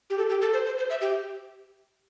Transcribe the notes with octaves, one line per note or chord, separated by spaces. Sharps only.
G4
A4
G4
A4
C5
C5
C5
E5
G4